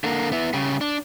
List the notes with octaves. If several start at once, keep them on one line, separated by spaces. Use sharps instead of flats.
D3 A#3
B3 E4
C#3 G3
D4